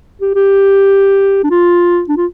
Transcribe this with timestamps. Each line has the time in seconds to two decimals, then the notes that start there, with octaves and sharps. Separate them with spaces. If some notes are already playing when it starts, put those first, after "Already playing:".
0.21 G4
0.35 G4
1.44 D4
1.50 F4
2.09 D4
2.17 F4